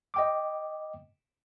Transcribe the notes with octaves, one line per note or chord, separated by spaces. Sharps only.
D#5 G5 D6